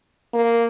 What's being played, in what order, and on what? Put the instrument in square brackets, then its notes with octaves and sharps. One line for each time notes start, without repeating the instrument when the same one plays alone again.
[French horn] A#3